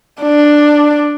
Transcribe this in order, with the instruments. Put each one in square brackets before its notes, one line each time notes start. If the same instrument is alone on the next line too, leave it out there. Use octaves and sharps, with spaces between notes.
[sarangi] D4